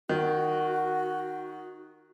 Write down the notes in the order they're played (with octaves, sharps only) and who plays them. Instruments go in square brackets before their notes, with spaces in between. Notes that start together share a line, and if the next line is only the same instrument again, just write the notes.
[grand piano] D#3 [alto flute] F#4